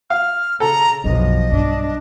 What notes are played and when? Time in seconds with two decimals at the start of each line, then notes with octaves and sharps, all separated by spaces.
0.10 F5 F6
0.60 C#3 A4 A#5
1.04 B1 F#2 F3 D4 D#5
1.52 G2 D4